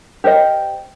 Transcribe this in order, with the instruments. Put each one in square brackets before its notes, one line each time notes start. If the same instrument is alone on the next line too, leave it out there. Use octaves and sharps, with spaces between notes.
[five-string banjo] G4 A#4 C5 D#5